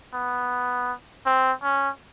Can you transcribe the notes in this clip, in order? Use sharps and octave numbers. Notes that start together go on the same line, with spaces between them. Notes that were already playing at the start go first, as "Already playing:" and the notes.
B3
C4
C#4